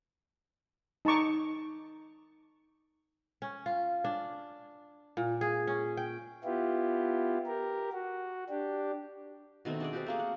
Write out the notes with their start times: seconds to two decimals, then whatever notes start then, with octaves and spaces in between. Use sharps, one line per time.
1.05 D#4 A5 A#5 C#6 D6
3.42 C#4
3.66 F4
4.04 D4
5.17 A#2
5.41 G#4
5.67 C#4
5.97 G5
6.44 B3 E4 F4 G4
7.47 G4 A#4
7.93 F#4
8.50 D4 G4
9.65 B2 D#3 A3 C4
9.80 D4 G#4 D5
9.93 C4 F#4 G4
10.06 A3 A#3 G#4
10.20 F#5